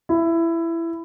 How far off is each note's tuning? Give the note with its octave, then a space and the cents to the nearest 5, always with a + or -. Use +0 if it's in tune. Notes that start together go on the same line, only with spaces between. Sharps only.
E4 +15